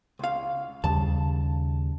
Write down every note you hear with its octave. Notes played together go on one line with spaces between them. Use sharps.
C#2 F5
D#2 C#3 G3 A5